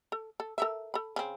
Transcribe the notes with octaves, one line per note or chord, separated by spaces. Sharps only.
A4
A4
A4 A#4 E5
A4 B5
C#3 C4